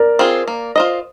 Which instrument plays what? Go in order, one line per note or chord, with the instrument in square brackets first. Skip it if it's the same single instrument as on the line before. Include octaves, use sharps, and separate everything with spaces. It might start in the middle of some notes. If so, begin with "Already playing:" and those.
Already playing: [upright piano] A#4 D5
[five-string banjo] C4 F4 G#4
A#3
F4 C5 D#5